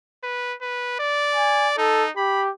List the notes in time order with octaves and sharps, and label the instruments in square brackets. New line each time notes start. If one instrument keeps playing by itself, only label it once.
[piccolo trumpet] B4
B4
D5
[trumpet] G#5
[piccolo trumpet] D#4 [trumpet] A4
[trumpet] G4 [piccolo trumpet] B5